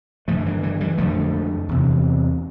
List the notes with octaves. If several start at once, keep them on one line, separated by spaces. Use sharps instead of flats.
G2 D3 F3 A3
E3 G3
E3 G3
E3 G3
F2 D3 F3 A3
E2 C3